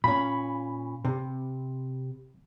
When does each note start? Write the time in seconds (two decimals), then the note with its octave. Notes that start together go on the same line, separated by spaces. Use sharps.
0.04 A#2 C#4 B5
1.05 C3